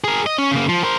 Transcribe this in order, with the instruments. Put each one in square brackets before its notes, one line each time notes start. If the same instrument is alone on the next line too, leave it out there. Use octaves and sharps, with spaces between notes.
[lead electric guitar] G#4 A#4
D#5
C#4
C#3 A#3
F3
A#4 C5